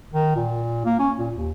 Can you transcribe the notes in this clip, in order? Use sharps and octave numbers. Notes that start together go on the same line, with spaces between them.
D#3
A#2
A#3
C#4
A#2
D#2